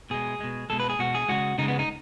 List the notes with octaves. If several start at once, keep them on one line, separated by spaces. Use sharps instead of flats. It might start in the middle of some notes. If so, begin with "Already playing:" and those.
B2 G#3 G#4
B2 G#3
B2 G#3 A4
B4
G#4
B2 G#3 F#4
G#4
C#3 G#3 F#4
C#3 G#3 D#4
B3
D#4